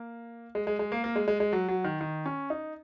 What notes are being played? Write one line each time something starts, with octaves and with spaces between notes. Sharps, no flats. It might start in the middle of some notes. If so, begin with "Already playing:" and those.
Already playing: A#3
G#3
G#3
G#3
A#3
A#3
G#3
G#3
G#3
F#3
F#3
D#3
D#3
C#4
D#4